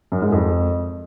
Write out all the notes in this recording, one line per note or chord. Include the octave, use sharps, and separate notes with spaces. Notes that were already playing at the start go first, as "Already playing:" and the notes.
F#2
G#2
F2